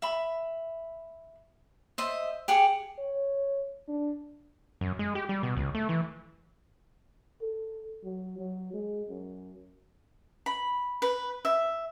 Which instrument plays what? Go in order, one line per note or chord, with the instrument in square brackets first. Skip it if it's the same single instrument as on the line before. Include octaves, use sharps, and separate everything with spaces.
[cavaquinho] E5 B5
C5 D#5 E5
G4 G#4 F#5
[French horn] C#5
D4
[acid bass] F#2
G#3
G4
G3
B2
C#2
A3
E3
[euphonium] A4
F#3
F#3
G#3
F#2
[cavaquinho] B5
B4
E5